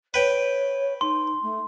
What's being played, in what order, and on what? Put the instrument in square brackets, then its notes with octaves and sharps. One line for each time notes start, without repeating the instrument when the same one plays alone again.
[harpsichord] B4 G5 [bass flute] C#5
[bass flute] D#4 [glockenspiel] C6
[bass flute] A3